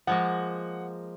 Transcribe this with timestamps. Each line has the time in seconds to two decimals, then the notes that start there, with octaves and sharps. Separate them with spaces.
0.07 F3 G#3 A#3 F#5